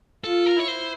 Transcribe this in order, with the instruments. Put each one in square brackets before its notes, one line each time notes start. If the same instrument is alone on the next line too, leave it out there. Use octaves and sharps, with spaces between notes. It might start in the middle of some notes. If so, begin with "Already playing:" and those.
[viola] F4 [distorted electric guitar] A4
[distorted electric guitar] A#4
[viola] E4 [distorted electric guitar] C#5
[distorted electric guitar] C5